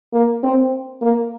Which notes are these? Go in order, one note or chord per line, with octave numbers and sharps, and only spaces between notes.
A#3
C4
A#3